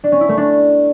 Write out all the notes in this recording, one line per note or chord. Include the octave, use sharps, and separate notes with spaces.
D4
C#4
E4
A3
D4